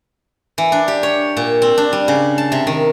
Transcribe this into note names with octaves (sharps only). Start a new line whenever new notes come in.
E3
D4
G4
C#5
A#2
C4
D4
G3
C#3
A5
C3
D#3